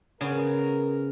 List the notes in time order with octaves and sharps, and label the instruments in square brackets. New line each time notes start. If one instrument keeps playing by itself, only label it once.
[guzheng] C#3 B3 [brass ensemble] A#4